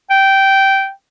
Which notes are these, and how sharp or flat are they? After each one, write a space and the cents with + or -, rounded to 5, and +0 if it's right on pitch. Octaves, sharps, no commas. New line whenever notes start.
G5 -10